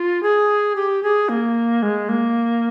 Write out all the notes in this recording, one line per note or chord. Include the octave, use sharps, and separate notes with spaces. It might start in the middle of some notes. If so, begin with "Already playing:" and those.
Already playing: F4
G#4
G4
G#4
A#3
G#3
A#3